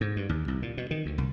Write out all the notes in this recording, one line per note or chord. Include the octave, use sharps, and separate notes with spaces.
G#2
G2
D#2
C2
A#2
B2
D#3
D2
C2